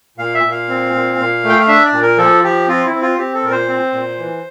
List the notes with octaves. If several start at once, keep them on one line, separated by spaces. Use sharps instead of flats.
A#2 F5
E5
A#2
F5
C4
A#2
A#2
A3
G5
F5
D4 E5
D5
A#2
A#4
F3 A4
F3 G4
C4 F4
E4
C4
F4
C4 G4
A4
A#2 A#4
C5
C4
A#2
E3